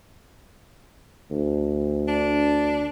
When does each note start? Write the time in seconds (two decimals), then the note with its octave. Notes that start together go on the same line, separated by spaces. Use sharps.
1.31 D2
2.08 D4